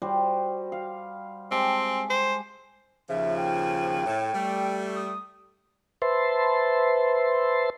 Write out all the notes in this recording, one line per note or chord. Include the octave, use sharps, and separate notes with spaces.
G3 F#4 C5
F5
G#3 C4 G4 A5
C5
D#2 C#3 F3 E5
G5
A2
G3 A3
D#6
B4 C5 E5 A5 C6